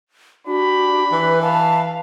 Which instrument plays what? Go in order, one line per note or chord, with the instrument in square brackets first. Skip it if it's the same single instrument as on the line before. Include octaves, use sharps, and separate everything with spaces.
[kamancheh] D4 G4 [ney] F#4 [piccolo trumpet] B5
[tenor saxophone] E3 [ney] B4
[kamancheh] F5 [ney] A5